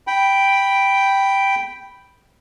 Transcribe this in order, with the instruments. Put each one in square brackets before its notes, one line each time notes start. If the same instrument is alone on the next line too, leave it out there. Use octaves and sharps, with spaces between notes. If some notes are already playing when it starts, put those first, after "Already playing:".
[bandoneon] G5 B5